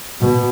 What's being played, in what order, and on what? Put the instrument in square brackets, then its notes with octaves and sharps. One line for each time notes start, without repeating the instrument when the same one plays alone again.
[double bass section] B2